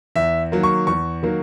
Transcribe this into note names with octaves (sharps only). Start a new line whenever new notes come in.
E2 E5
D#3 F#3 A#3
C#6
E2 C#6
D#3 F#3 A#3